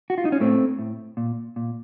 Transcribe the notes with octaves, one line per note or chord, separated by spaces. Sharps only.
F#4
F4
D#4
C#4
A2 A3 C4
A2
A#2
A#2